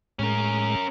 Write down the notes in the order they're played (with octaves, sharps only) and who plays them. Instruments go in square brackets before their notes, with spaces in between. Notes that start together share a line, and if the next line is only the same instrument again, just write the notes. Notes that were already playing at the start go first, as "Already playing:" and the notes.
[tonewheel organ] A2 G#3 [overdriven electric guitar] C#4 A#4